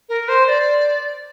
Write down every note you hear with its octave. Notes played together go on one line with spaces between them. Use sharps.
A#4
C5
D5